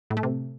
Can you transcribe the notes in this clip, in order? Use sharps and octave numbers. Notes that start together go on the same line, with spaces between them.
A2
A3
C3